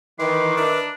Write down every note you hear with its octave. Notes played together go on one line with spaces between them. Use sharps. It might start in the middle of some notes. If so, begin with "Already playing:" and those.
D#3 E3 B4 C6 D6
D4 A#4 E5